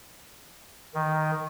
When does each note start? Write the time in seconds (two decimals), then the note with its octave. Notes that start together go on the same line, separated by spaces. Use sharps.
0.95 D#3